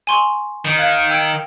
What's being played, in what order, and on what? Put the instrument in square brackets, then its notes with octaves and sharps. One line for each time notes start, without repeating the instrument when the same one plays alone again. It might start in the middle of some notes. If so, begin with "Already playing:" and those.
[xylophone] G#5 C6 C#6
[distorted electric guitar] D#3
[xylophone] F5 F#6 G#6
G5 E6 G#6